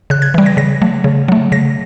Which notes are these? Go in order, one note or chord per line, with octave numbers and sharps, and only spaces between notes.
C#3 F#6
G#6
E3 G3
A#6
C#3 A#6
F#3 A3
C#3
F#3 A3
C#3 A#6